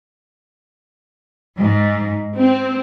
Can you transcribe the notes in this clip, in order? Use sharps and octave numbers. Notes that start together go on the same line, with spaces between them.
G#2
C4